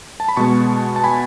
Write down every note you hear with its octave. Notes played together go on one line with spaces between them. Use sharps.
A5
B5
B2 G#3 B3 A5 C#6
A5
G#5 B5